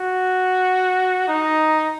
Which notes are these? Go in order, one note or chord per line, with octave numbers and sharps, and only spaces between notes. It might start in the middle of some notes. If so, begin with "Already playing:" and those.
Already playing: F#4
D#4